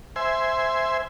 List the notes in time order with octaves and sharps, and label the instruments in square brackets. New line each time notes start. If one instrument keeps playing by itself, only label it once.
[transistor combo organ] C5 E5 G#5